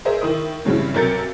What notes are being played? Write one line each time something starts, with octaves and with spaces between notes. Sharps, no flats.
G#4 A#4 C5 D#5 E5
D#3 E4 D#6
G2 C#3 E3 G3 C4 E4
B1 C3 A#4 G6 A6 C#7